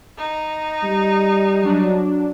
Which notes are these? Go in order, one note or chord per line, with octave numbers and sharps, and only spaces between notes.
D#4
G3
F#3 D4